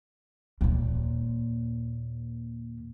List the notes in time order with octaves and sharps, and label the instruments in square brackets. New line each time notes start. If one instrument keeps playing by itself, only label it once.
[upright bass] D#2 A#2